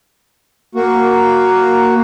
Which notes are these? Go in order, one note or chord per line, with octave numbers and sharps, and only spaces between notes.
A#3 F#4